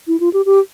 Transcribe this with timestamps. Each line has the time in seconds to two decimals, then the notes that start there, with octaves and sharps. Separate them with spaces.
0.08 E4
0.20 F4
0.33 G4
0.46 G4